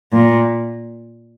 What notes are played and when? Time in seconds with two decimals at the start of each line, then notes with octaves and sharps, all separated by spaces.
0.13 A#2